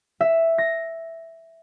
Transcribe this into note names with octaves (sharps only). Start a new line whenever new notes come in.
E5
A#6